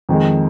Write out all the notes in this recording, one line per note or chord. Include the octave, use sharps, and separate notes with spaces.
F2 D#3 G#3